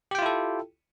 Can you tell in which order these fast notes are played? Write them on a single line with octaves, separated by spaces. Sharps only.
G4 G5 F4 E4 A4